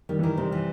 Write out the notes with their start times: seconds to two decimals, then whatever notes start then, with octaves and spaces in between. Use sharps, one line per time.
0.09 D#3 G3
0.19 E3
0.23 D#3
0.38 C3 G3
0.52 E3